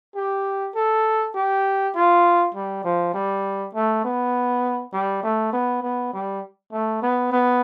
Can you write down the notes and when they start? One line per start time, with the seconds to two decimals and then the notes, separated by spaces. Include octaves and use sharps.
0.16 G4
0.75 A4
1.35 G4
1.95 F4
2.54 G3
2.84 F3
3.14 G3
3.74 A3
4.04 B3
4.93 G3
5.23 A3
5.53 B3
5.83 B3
6.13 G3
6.72 A3
7.02 B3
7.32 B3